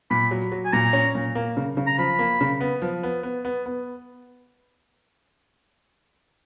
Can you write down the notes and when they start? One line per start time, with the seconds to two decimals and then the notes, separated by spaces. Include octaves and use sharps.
0.10 A#2 B5
0.31 F#3
0.52 F#3
0.65 G#5
0.73 A#2 A#5
0.93 C#4
1.15 A#2
1.35 A#3
1.57 C#3
1.77 C#3
1.86 A#5
1.98 F3 B5
2.19 A#3
2.41 C#3
2.61 B3
2.82 F3
3.03 B3
3.23 B3
3.45 B3
3.66 B3